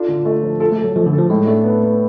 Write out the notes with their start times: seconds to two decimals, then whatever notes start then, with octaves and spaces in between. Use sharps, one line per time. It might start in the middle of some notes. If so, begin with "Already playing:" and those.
Already playing: D4 F4 A4
0.08 D3
0.25 A3
0.43 F3
0.60 F4 A4
0.72 A3
0.78 A4
0.84 F#3
0.96 F3 A3
1.06 D3
1.13 F3 A4
1.30 A2 G#3
1.47 A3 D4
1.64 B3
1.82 B3